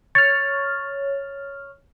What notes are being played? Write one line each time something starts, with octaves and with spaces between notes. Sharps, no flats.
C#5 F6 A6